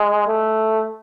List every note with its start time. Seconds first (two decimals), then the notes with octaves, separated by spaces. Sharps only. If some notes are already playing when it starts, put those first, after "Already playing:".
Already playing: G#3
0.27 A3